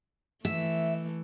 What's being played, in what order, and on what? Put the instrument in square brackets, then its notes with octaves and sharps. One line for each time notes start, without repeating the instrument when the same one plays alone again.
[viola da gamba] E3 A3 [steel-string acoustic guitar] E5